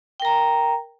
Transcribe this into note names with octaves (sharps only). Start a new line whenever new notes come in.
A#4 G5 A#5